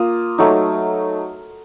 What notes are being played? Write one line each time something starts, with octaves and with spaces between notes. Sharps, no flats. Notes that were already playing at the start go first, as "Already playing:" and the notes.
Already playing: A#3 F4 D#6
F#3 A3 D#4